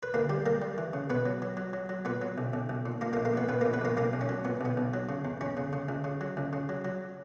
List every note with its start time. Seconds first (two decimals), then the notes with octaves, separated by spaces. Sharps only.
0.03 B4
0.14 D2 A#3 A#4
0.29 G3 G4
0.46 G3 A#3 A#4
0.62 G3
0.78 E3
0.93 C#3
1.10 B2 B3 B4
1.26 F#3
1.42 F#3
1.57 F#3
1.73 F#3
1.89 F#3
2.05 A#2 B3 B4
2.22 F#3
2.38 B1
2.53 B1
2.69 B1
2.86 A#2
3.01 A#2 A#3 A#4
3.13 A#3 A#4
3.17 A#1
3.25 A#3 A#4
3.33 A#1 B3 B4
3.49 A#1 B3 B4
3.61 A#1 A#3 A#4
3.73 B3 B4
3.81 A#1 A#3 A#4
3.97 B1 A#3 A#4
4.13 B1
4.21 C#4
4.29 F#3
4.45 A#2 B3
4.61 B1 B3
4.77 B1
4.94 F#3
5.09 C#3
5.25 E2
5.41 E2 C#4
5.57 C#3
5.73 C#3
5.89 C#2
6.04 C#3
6.21 F#3
6.37 C#2
6.53 C#3
6.69 F#3
6.85 F#3